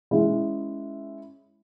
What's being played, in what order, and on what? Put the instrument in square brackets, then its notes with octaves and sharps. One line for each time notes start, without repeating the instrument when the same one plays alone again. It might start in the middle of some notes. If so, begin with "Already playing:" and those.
[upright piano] G#3 C#4 E4